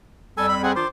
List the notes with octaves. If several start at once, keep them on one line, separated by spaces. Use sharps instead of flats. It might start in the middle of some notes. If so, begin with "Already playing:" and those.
F2 G3 A4 G#5 E6
B5
C4 G#4 F#5
D#3 D4 F4 C5 D6